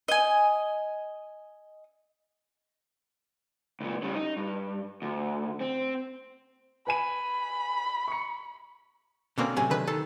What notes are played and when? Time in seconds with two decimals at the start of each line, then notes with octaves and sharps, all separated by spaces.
0.08 D#5 G#5
3.81 C#2 A#2
4.03 C#3 G3
4.15 D#4
4.37 G2
5.02 D2
5.61 C4
6.87 B4 G#5 B5 D#7
8.08 C#6 C#7
9.38 B2 D3 A#3 C4 C#4
9.57 A2 C3 F#3 G#5
9.70 D3 D#3 B4
9.87 D#3 A4